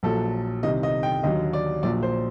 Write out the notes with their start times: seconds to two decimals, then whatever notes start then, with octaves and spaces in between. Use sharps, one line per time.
0.03 A#1 A#2 F#3 A4
0.63 C2 C3 D#3 D#5
0.83 D#5
1.03 G5
1.23 D#2 D3 F#3 D#5
1.53 D5
1.83 A#1 A#2 F#3 D5
2.03 C5